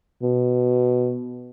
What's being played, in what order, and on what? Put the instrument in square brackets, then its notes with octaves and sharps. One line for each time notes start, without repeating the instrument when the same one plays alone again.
[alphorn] B2